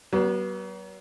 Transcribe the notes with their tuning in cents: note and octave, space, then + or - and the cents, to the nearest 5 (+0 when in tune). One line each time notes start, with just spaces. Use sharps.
F#3 +40 B3 -30